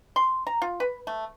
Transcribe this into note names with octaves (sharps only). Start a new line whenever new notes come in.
C6
A#5
F4
B4
A3